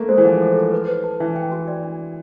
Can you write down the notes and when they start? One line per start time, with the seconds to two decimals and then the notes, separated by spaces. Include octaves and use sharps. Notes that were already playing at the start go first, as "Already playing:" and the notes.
Already playing: A3 A#3
0.09 G#3 C5
0.18 E3
0.25 F3 F#5
0.41 A4
0.56 A4
0.72 B4
0.88 B4
1.04 A5
1.20 E3 E5
1.36 G5
1.52 F#4
1.68 D5
1.83 D4
1.99 D4